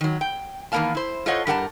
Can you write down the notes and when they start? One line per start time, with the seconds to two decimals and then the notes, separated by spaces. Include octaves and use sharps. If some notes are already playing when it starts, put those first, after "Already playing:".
0.01 D#3 F#3
0.21 G5
0.72 E2 D#3 A#3 B3 F5 A5
0.95 E4 C5
1.26 F4 A4 C5 C#5 D#5 F#5
1.47 G2 G4 A#4 F#5 G#5 A5